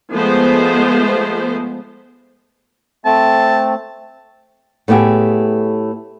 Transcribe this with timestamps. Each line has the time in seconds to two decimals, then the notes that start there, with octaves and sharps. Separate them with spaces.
0.13 F3 G#3 A3 B3 C5
3.06 A3 C4 A5
4.88 A2 A3 B3 G4 G#4